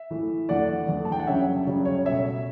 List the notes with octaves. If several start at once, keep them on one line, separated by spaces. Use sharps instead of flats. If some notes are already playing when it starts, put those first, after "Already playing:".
Already playing: E5
A2 E3 A3
E2 D3 A3 D5 F#5
E2 D3 A3
A5
G5
F#5
F#2 C#3 G3 C#5 E5
F#2 C#3 G3 C#5
C#5
B2 A3 C#5 E5